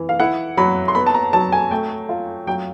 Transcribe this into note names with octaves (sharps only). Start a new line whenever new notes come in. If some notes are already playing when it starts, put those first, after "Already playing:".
Already playing: E3
F5
E4 F#5
F#3 B5
C6
B3 B5
A5
A#5
F#3 A5
G#5
A3 G5
F4
F#3 G5